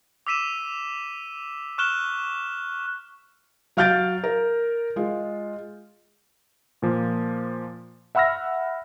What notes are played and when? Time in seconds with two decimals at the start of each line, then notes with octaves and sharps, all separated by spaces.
0.27 D6 E6 B6 D#7 E7
1.78 C#6 F6 F#6 E7 G7
3.77 F#3 F5 F6 G6 A6 D7
4.24 A#4
4.96 G#3 F4
6.82 A#2 F3 A#3
8.15 E5 F#5 B5 E6 F6 A#6